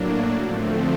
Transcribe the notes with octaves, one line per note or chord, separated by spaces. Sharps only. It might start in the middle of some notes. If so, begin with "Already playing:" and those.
Already playing: A2 F#3 A#3 D4
D3 F3 A3 C4